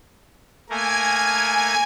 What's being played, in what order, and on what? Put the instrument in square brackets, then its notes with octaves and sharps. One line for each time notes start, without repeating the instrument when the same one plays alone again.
[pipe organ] A3 A#3 A#4 [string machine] G#5 G#6